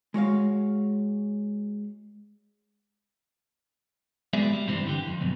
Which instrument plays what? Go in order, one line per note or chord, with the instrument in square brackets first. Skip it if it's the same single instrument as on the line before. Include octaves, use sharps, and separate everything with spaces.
[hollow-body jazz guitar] G#3 F#4 C#5 F5
[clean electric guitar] G#3 B3 F#4 G#4 D5 E5
G3
G2 C3 E3 G3 C4 D4
D3 E3 G4
F2
F#2 B2